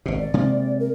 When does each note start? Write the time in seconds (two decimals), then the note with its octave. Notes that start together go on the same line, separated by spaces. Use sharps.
0.06 G#1 B2
0.19 D5
0.34 C3 G#3 A#3
0.80 A#4